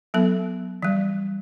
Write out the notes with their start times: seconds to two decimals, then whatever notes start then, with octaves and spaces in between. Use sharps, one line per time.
0.14 F#3 B3 A4
0.83 E3 G3